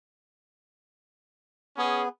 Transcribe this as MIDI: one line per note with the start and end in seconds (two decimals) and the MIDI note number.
1.78 2.09 59
1.78 2.06 61
1.78 2.06 68